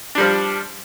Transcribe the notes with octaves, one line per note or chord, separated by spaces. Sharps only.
F3 G3 D4